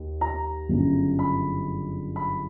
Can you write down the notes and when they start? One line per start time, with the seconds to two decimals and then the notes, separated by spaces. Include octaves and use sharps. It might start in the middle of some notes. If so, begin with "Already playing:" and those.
Already playing: D#2
0.21 A#5
0.69 G1 F#2 C#3
1.19 B5
2.16 B5